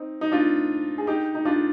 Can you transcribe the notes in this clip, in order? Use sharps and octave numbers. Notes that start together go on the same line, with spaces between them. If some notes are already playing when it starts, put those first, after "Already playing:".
Already playing: C4 D#4
D#4
D4 F4
G#4
D#4 G4
D#4
D4 F4